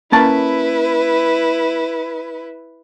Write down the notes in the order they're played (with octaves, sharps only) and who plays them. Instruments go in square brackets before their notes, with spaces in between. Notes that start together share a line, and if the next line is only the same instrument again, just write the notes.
[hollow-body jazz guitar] A#3 C#4 A5 [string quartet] E4 B4